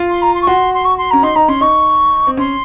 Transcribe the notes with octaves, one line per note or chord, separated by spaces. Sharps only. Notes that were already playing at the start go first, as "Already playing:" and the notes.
Already playing: F4
C6
A#5
C6
C#6
F#4 C6
C6
C#6
C6
C#4 A#5
D#4 C6
D#4 A#5
C#4 C6
D#4 C#6
C4
C#4 C6